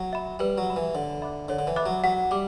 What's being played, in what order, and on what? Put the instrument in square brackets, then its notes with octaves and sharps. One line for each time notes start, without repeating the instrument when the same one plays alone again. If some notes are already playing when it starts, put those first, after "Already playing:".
Already playing: [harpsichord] F#3
[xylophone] E5 B5
[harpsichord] G3 [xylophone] B4
[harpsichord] F#3
[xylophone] E5 B5
[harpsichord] E3
[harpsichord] D3 [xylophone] C#5
[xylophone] E5 B5 D6 F#6
[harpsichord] D3 [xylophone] C#5
[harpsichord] D3
E3
[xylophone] E5 B5 D6 F#6
[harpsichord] F#3
[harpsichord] F#3 [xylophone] F#5
[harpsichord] G3 [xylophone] D6